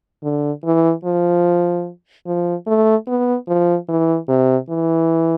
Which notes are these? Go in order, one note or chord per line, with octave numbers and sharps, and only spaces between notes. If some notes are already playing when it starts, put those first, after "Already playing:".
D3
E3
F3
F3
A3
B3
F3
E3
C3
E3